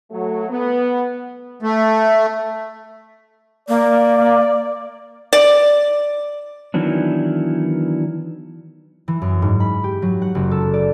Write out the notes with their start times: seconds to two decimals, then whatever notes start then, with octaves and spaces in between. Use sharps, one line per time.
0.11 F#3 A3
0.50 B3
1.62 A3
3.69 A#3 D5
5.33 D5
6.74 D#3 E3 F#3 B3 D4
9.08 E3
9.22 F#2
9.42 G#2
9.60 B5
9.84 G4
10.02 F#3
10.22 F#5
10.35 F#1
10.51 A4
10.74 D5